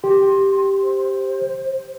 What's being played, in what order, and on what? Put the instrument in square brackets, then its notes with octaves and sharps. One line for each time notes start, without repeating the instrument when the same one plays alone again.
[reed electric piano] G4 [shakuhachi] C6
[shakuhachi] C5